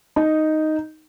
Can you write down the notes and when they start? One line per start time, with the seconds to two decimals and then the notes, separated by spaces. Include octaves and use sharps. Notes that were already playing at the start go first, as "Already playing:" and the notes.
0.16 D#4